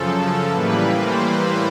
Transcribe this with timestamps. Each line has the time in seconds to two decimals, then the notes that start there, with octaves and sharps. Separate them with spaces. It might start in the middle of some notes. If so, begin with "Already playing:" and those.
Already playing: F#2 C#3 F3 A4
0.49 A2 E3 G3 A#3 B4
0.95 C5